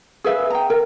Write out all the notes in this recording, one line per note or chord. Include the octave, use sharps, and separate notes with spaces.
G#4 B4 E5 F5
G5 A#5
A#4